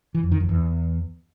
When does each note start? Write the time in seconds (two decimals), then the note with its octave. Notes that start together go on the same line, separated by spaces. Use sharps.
0.15 E3
0.23 F2
0.32 D#3
0.40 F2
0.49 E2